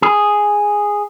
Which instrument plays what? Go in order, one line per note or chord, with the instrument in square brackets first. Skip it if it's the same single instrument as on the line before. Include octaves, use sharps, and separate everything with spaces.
[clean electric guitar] G#4